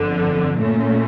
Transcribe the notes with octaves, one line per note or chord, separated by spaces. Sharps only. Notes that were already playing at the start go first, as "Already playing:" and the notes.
Already playing: G1 F2 D3
A#2 A3 C#4